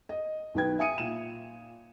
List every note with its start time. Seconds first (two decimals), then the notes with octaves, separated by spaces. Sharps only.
0.09 D#5
0.54 B1 D#3 D#4 B4 G5 G#6
0.79 E5 G#5 D#6 C#7 D#7
0.98 A#2 E7